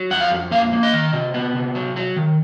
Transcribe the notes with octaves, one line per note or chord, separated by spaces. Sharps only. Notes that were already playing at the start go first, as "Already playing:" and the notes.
Already playing: F#3
F2 F#5
F5
F2
A#3 F5
A#3
D#5
D#3
C3
B3
C3
F#3
F#3
D#3